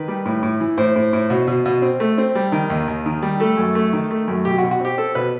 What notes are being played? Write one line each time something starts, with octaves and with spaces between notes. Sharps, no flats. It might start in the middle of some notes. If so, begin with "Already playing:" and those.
Already playing: D#3 B4
G3
A2
A2
E3
A2 C5
A2
A2
B2
B2
B2
C4
A3
C4
G3
D#3
D#2
D#2
D#3
G3
A3 A4
F#2
A3
D#3
A3
F#2
B2 G4
F#4
B2
F#4
C4 G4
C4 A4
B2 B4